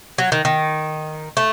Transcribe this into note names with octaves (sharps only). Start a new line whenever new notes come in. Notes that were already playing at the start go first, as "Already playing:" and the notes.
F#3
D#3
D#3
A3